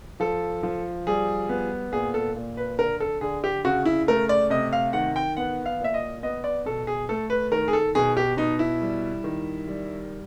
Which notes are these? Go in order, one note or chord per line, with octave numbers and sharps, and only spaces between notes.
F3 A4
F3
G3 G#4
B3
A#2 G#4
A4
A#2
B4
D3 A#4
A4
D3 G#4
G4
C#3 F#4
E4
A3 A#4
D5
C3 D#5
F5
D#3 F#5
G5
B3 F#5
F5
A#2 E5
D#5
B3 D#5
D5
B2 A4
G#4
A3 A4
B4
D#3 A#4
G#4
A4
B2 G#4
G4
B2 D#4
E4
G3
D#3
G3